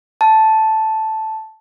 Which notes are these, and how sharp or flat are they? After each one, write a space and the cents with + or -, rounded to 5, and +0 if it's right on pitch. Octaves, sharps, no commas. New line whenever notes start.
A5 -5